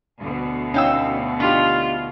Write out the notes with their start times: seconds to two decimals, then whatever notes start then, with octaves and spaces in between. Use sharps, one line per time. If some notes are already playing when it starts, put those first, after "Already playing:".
0.20 D2 B2
0.74 C#4 D#4 C#5 F5 G5 E6
1.40 D4 D#4 F4 G4 B4